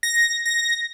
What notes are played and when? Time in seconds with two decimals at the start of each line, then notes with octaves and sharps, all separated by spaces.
0.03 A#6
0.46 A#6